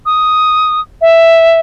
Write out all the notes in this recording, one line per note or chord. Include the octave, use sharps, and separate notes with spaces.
D#6
E5